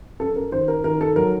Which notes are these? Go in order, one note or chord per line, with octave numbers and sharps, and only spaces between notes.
F#2 A4
A#4
D#3 C5
A#4
D#3 A#4
A4
F#3 A#4